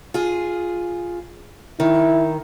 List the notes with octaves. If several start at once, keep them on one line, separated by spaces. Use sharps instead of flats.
F4 G#4
D#3 E4